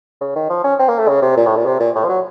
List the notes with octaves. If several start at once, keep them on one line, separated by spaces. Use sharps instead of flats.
C#3
D#3
F3
C#4
C4
A#3
A3
C#3
C3
A#2
A2
A#2
C3
A#2
A2
F3
F#3